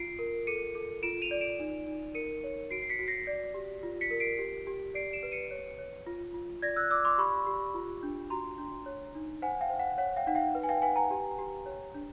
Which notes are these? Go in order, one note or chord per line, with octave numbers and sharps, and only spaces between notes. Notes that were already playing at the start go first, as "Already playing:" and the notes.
Already playing: F4 C7 D7
A#4
A4 C#7 D#7
A4
F4 D7 E7
D#7 F7
D5
D7 E7
D#4
D#4
A#4 C#7 D#7
C#5
F#4 C7 D7
C7
B6 C#7
F#4
A#6 C7
D5
G4
F4
B6 C#7
A#4
C7 D7
G4
G4
D5 C7 D7
D7 E7
B4
C#7 D#7
C#5
C#5
F4
F4
D5 G#6 A#6
E6 F#6
D5 D6 E6
C6 D6
G4 B5 C#6
G4
F4
D4
F#4 A#5 C6
D4
C#5
D#4
C5 F#5 G#5
F5 G5
C5
F#5
C#5 F#5
F5 G5
D#4 F#5
F5 G5
B4
G#5
F5 G5
B4 F#5 G#5
G#5 A#5
G4
G4
C#5
D4